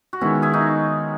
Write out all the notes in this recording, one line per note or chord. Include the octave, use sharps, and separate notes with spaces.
F#4
D#3 G#3 B3 C#4 E4
E4 G#4
D#4 F#4